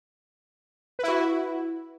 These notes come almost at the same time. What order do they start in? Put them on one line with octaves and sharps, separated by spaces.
B4 E4 F#4